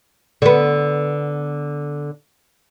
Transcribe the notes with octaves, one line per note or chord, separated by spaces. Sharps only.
D3 B3